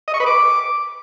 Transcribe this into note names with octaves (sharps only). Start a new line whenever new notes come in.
D#5
C#6
B4
D6